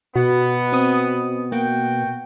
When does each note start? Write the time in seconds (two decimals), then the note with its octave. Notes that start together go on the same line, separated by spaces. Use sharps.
0.15 B2 B3 F#4
0.73 C4 D#6
1.52 A#3 F#4 G5